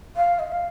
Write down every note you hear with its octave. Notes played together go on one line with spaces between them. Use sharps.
F5
D#5
F5